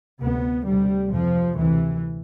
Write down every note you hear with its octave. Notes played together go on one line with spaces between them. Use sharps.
D2 C3 B3
D2 C3 G3
F2 C3 F3
D2 C3 E3